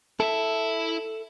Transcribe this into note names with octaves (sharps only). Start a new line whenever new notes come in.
E4 A4 E5